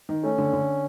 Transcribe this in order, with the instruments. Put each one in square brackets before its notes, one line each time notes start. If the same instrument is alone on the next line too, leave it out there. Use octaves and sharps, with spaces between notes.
[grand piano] D#3
[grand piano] A3 [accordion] C#4
[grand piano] D3
D3